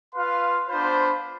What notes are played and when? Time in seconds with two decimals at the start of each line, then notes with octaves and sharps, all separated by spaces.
0.15 F4 B4 F5 C6
0.69 B3 D4 F4 C5 B5